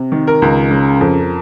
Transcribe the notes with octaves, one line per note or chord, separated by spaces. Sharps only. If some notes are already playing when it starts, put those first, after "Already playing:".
Already playing: C3
D#3
A#4
C#2
C#3
F2